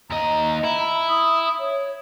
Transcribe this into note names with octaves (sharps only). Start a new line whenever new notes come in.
D#2 D#5 A#5
E4
D#6
C#5